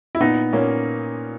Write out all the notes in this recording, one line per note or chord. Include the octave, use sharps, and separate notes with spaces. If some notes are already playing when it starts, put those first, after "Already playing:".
E4
A#2 B3 D#4
A#2 A#3 C#4